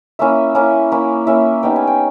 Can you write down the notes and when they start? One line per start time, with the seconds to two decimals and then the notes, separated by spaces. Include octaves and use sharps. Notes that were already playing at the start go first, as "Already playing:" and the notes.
0.19 A#3 C#4 E4 E5
0.55 A#3 C#4 E4
0.92 A#3 C#4 E4
1.27 A#3 C#4 E4 E5
1.63 G3 B3 D#4 G5
1.76 G#5
1.87 G5